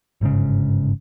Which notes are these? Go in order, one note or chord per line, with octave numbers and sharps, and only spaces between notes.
G1 G#2 C#3